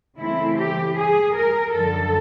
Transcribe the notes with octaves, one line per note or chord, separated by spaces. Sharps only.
C#3 E3 A3 C4 E4
G4
G#4
A#4
F#2 D3 F3 A4